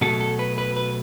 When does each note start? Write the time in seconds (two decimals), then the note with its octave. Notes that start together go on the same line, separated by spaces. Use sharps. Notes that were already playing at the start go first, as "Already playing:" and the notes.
0.01 B2 F#3 A3 A4
0.21 A4
0.39 B4
0.58 B4
0.76 B4